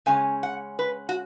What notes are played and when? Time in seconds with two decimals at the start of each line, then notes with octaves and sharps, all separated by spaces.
0.06 C#3 G#3 C#4 G#5
0.43 F#5
0.79 B4
1.09 F#4